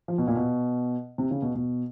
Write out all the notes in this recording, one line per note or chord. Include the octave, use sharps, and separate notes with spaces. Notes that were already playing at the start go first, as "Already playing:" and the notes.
F3
B2
A#2
B2
C3
C#3
B2
B2